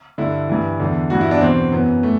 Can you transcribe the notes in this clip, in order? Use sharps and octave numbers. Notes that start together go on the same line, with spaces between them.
G2 D3 E4
G2 E3
E2 D3
G2 E3 F#4
E4
D4
E2 B2 C4
F#2 E3 B3
E3 A3